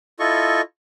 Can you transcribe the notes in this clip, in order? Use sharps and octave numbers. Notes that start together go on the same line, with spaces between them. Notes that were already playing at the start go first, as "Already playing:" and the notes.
E4 F4 A4 D#5 C#6